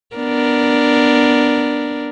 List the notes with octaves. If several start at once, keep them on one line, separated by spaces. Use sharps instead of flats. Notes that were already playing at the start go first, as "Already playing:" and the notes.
B3 D4 A#4